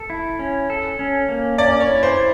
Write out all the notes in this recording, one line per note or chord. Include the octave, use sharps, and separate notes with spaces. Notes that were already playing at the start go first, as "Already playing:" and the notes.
Already playing: A4
E4
C#4
A4
C#4
A#3
C#4 D5
C#5
E4
C5
E4